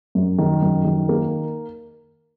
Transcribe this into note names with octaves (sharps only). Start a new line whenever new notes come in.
F#2
D#3
F#2
D#3
A#3